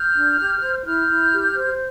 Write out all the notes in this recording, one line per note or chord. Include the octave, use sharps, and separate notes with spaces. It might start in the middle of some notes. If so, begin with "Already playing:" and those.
Already playing: F6 G6
D4
G4
C5
E4 F6 G6
E4
G4
C5